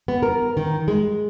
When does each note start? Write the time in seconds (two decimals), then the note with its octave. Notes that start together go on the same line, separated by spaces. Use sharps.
0.08 B3
0.23 A#4
0.57 D#3
0.88 G#3